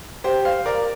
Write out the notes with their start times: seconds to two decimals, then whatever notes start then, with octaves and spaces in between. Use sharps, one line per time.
0.24 G4 C5
0.45 C5 F5
0.66 A#4 D5